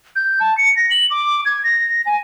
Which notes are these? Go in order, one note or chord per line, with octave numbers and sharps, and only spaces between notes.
G6
A5
C#7
A#6
F#7
D6
G#6
A#6
G#5